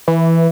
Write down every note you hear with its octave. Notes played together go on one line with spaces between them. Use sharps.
E3